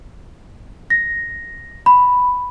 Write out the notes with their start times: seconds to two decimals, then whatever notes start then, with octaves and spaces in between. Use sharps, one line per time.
0.90 A#6
1.86 B5